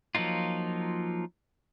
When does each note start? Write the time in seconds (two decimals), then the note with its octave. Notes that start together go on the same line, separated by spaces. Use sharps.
0.15 F3 F#3 A#3 D#4 F4